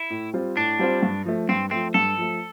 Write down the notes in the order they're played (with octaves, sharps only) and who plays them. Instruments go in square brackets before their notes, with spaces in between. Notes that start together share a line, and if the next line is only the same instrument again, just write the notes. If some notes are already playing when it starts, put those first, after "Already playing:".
Already playing: [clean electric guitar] E4
[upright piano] A2
G3 C4 F4 C5
[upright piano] A2 [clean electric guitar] D4
[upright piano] G3 C4 F4 C5
G2
F3 A3
[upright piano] G2 [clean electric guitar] C4
[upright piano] F3 A3 [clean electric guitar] C4
[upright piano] G2 [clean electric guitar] A4
[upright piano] F3 A3